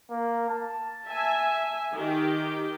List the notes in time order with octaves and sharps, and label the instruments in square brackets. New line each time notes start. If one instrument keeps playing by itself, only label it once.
[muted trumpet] A#3
A5
[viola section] E5 G#5
[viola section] D#3 G4 [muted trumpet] D#4